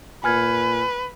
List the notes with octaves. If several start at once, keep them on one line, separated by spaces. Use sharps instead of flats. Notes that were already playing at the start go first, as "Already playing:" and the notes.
A#2 B4 G#5 F6 G#6